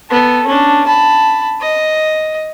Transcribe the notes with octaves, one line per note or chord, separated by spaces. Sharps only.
B3 A4
C#4 D4
A5 B5
D#5